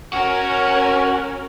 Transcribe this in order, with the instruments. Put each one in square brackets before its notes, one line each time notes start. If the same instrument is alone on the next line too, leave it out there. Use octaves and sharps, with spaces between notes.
[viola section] C#4 A#4 [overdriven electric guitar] F#4